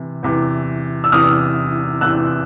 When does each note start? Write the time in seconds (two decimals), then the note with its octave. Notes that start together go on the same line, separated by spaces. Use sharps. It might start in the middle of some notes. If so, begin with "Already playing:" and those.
Already playing: C3 E3
0.23 E2 C3 E3
1.04 E6
1.12 E2 C3 E3 D#6 F6
2.01 E2 C3 E3 E6 F#6